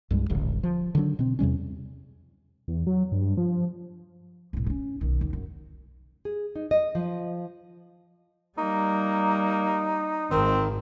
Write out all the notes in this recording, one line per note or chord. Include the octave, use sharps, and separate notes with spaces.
C2 G2 F#3 G#3
D#1 A1 D3
F3
D3 D#3 F#3 D4
B2 C4
E2 C3 G3 C#4
E2
F#3
G2
F3
C2 A2
B3 C#4
B1 D#3
D#2
F#2
G#4
D#4
D#5
F3
G3 A#3 D#4
G#1 D#3 C4